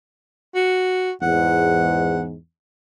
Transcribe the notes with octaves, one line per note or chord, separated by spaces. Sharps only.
F#4
E2 G#2 F#5